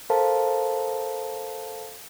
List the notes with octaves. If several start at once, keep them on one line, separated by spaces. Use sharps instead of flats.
A4 A#4 C5 F5 A5